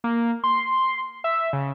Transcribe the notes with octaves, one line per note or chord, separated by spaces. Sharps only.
A#3
C6
E5
C#3